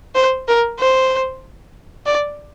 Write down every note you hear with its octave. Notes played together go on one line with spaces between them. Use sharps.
C5
A#4
C5
D5